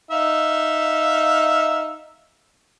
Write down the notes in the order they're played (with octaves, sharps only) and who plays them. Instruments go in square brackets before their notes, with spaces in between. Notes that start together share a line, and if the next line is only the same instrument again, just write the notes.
[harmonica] D#4 E5 F5